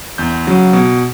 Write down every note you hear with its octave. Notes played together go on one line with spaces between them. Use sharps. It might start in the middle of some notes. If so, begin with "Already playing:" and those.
E2 G6
C#3 F#3
B2